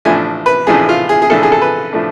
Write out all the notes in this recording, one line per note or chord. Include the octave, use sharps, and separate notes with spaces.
A1 A2 F3 A3 D4 G#5
B4
A1 A2 F3 A3 D4 G#4
F4
G#4
G#4
A1 A2 F3 A3 D4 A4
G#4
A4
B4
A2 F3 A3 D4